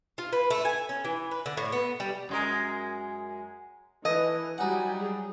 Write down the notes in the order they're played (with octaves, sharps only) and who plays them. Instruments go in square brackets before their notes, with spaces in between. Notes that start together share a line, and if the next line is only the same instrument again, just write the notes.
[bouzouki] F4
B4
A3
G#5
C#4
E3
B4
D3
A2
B3
G3
[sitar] F#2 G#3 A#4
[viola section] E3 [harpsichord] A4 [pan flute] B4 [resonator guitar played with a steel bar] D#5
[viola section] F#3 G3 [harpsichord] D#4 F#5 [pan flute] G#5
[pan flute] G#4